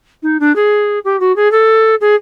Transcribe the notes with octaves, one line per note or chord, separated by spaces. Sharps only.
D#4
D4
G#4
G4
F#4
G#4
A4
G#4